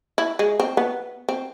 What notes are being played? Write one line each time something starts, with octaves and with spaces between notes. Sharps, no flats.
E4
G#3
C4
B3
C4